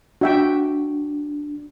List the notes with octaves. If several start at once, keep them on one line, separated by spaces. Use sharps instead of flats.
D4 F#4 E5 G5